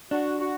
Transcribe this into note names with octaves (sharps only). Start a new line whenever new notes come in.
D4 F#4
F#4